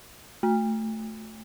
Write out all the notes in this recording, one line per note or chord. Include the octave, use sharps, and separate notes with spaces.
A3